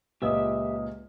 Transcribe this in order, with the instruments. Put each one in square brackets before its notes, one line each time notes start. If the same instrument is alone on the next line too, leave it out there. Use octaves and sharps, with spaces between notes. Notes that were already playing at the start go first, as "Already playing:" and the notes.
[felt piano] C#2 A#2 [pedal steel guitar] G4 E5 E6 [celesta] B4 D#5 D#6